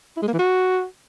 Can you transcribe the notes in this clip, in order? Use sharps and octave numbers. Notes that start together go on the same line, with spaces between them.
E4
G#3
A#3
E3
F#4